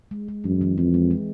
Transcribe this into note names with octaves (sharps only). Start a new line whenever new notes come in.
G#3
G#3
F#2 E3
E3
F2 C4
G#3
G#3